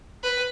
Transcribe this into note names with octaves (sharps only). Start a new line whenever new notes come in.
B4